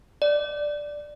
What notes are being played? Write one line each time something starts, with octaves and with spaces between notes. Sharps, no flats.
D5